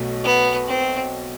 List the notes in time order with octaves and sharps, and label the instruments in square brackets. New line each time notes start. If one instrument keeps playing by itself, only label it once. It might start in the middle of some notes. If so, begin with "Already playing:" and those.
Already playing: [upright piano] B1 B2 A3
[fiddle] B3
C4